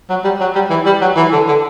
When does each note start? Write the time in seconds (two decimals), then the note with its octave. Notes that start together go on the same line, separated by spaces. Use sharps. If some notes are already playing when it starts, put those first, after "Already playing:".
0.10 F#3
0.24 G3
0.40 F#3
0.55 G3
0.70 E3
0.86 G3
1.01 F#3
1.17 E3
1.32 D3
1.48 D3